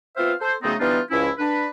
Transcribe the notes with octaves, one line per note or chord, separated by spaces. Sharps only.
B3 C4 F4 C5 E5 F5
A4 C5
C#3 F#3 A3 B3 C4 D#4
E3 G3 B3 D4 D#4 F4
C#2 F3 C#4 E4
D4 B4